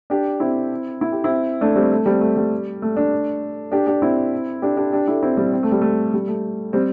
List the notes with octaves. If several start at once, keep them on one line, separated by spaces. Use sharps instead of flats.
D4 G4
C4 E4
E4
G4
C4 E4
A3 D4
G3 C4
A3
G3 C4
A3
G3
A3
A3 D4
D4 G4
D4 G4
C4 E4
D4 G4
D4 G4
D4 G4
E4 A4
C4 E4
G3 C4
C4
A3
G3
A3
G3
A3
G3 C4